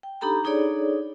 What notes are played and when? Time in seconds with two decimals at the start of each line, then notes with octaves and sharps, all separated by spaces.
0.03 G5
0.21 D4 D#4 G4 A4 A#5 B5
0.44 D4 D#4 G#4 A4 C#5 D5